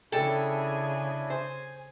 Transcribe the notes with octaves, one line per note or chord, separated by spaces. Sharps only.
C#3 D4 E4 G#4 A4 G5 G#5
C5 G#5